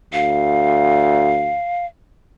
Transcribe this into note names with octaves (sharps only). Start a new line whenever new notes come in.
D2 F5